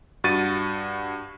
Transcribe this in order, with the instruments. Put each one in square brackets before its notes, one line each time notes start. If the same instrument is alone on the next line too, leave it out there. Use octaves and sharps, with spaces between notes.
[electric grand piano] G2 F#4 A6 D#7